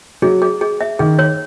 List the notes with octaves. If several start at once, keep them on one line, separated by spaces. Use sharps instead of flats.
F#3 G#4
G#4
G#4
E5
D#3 G#4
C#5